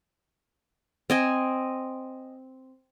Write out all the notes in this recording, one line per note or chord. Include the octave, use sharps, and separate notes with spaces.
C4 D#5 G#5